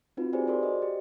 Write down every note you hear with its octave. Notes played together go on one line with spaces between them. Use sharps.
C4 D#4 F4 F#4 B4
G4 G#4 B4 C5 D5 G#5
F#4 G#4 A#4 C5 D5 C6
D#5
G4